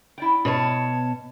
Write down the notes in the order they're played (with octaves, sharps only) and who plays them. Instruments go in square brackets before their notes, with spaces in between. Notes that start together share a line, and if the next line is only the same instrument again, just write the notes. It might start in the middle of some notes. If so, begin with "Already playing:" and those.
[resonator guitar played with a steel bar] E4 D5 G5
[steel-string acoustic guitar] B2 C#5 A5